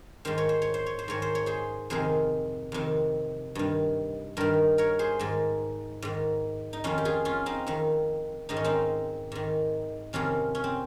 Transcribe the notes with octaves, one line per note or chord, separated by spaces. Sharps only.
G#2 D#3 C5
C#5
C5
C#5
C5
C#5
C5
G#2 D#3 C#5
C5
C#5
G#4 C5
F2 C3 D#3 G#4 C5
F2 C3 D#3
G2 D#3
G2 D#3 G4 A#4
A#4 C#5
G#4 C5
G#2 D#3
G#2 D#3
D#4
F2 D#3 C#4 F4
G4
F4 G#4
C#4 F4
C4 D#4
F2 D#3
G#2 D#3 D#4
C#4
C4 D#4
G#2 D#3
F2 C3 D#3 C#4 F4
C#4
C4